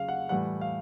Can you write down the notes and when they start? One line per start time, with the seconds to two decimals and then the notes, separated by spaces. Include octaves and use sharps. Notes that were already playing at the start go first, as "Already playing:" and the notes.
Already playing: C#3 F#3 F5
0.08 F#5
0.29 A2 E3 G3 F#5
0.61 F5